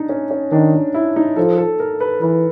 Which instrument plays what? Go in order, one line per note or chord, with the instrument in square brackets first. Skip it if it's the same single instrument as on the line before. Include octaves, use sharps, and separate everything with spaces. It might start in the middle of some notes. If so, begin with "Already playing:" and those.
Already playing: [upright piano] D4 D#4
C#4
C#4
[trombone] D#3 [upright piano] D4
[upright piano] D#4
E4
D#4
[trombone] F3 [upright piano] A4
[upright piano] A4
A#4
B4
[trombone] E3 [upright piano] B4